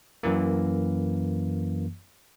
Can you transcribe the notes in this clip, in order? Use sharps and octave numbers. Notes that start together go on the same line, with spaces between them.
F#2 E3 A#3